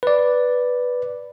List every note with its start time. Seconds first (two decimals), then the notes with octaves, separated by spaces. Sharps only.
0.03 B4 D5